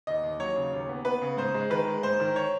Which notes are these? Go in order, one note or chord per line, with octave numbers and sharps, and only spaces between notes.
D#2 D#5
D#2
F#3 C#5
C#3
D#2
B3
B3 B4
C#3
G#2 C5
G#3
D#3 B4
G#3
G#2 C5
D#3
C#5